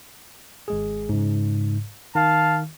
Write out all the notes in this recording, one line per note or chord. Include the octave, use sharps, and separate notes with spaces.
G#1 G#3 G#4
G#2 C#3
D#3 F5 A5